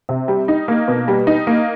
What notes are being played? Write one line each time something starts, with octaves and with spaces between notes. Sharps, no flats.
C3
G3
D#4
A#3
B2
G3
D#4
A#3